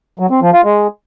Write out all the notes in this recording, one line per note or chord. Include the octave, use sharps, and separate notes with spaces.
F#3
C4
F3
F4
G#3